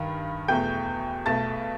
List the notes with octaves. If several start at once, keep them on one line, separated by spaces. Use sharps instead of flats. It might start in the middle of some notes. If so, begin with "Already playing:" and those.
Already playing: G2 D#3
E2 B2 A3 G5 G6
B1 B2 A3 A5 A6